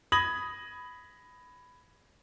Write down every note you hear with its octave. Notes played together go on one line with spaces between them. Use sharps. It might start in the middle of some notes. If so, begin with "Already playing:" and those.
B5 D#6 G#6 A#6 F#7